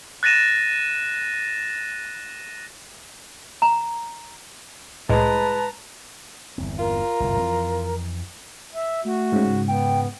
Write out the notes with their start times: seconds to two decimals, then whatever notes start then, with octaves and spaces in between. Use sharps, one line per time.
0.23 F#6 A6 A#6 D#7 E7
3.62 A#5
5.09 C2 A2 G#3 B4 A5 A#5
6.58 G1 E2 C4
6.79 F4 A#4
7.20 G1 C2 F#2
7.36 F2 E3 C4
8.75 E5
9.05 A3 F#4
9.32 G#2 C#3
9.68 B3 G5